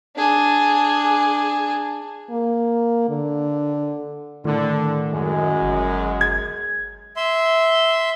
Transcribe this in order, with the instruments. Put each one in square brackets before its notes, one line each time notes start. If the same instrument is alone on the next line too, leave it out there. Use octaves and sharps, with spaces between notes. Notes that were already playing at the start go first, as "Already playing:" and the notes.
[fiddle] D4 G#4
[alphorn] A#3
D3
[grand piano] A2 [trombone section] D3 [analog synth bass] D#3
[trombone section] F#2 G#3
[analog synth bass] G1
[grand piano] G#6
[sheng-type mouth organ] E5 C6